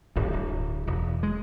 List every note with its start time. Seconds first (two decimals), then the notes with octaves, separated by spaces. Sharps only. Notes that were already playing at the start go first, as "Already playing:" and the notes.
0.16 D1 G1 G2
0.33 D1
0.87 E1
1.23 G#3